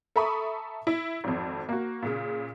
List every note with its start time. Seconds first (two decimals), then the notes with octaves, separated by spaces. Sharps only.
0.16 A4 E5 A#5 B5 C#6 D#6
0.87 E4
1.24 G#1 F2
1.69 A#3 F#4
2.02 A#2 C#3